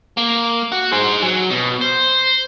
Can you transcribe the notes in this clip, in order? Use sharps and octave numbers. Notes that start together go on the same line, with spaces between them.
A#3
F#4
G#4 C5
F#3
B2
C5